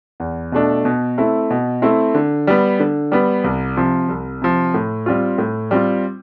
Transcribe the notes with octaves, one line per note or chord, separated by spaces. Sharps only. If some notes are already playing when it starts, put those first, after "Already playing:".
E2
B2 A3 D4
B2
A3 C4 E4
B2
A3 C4 E4
D3
G3 B3
D3
G3 B3
C2
C3 F3
C2
C3 F3
A2
G3 C4 F4
A2
G3 C4 F4